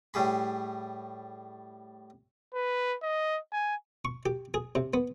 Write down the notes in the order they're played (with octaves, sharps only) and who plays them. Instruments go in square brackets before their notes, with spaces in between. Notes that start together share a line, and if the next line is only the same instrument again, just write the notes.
[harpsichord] A2 G3 G#4 B5
[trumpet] B4
D#5
G#5
[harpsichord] C#6
G4
G#4
C3
B3